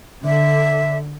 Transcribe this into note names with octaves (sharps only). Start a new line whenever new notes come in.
D3 E5